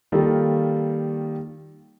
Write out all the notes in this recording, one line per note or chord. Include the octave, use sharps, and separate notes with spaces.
D#3 G3 A#3 F4 G4 A4